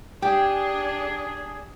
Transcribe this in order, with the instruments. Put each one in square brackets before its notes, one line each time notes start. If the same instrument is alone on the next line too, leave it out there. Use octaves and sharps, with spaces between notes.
[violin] D4 [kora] G4 [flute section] G#4